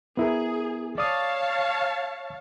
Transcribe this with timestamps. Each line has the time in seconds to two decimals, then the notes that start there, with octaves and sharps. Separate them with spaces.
0.17 B3 E4 G#4 A#4
0.98 C#5 D5 F5 A5 D#6